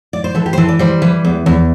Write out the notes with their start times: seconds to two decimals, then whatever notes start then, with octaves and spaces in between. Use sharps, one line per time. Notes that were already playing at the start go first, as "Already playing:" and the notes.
0.13 D5
0.24 C5
0.35 E3 A4
0.46 G4
0.53 C5
0.57 E3 A4
0.69 D5
0.79 G3 C5
1.02 E3
1.25 E2
1.46 E2